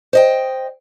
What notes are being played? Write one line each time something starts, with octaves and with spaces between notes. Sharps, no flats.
C5 D#5 G5